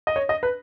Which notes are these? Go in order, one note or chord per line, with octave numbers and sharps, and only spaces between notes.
D#5
C#5
D#5
B4